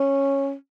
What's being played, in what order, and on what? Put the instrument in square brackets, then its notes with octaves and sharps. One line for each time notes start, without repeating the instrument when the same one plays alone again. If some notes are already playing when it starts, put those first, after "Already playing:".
Already playing: [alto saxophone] C#4